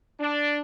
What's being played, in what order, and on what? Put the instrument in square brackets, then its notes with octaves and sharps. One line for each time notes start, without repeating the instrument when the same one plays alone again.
[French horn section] D4